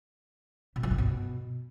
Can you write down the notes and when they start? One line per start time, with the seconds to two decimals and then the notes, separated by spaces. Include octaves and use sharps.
0.76 B2
0.83 F3
0.91 G2
0.98 B2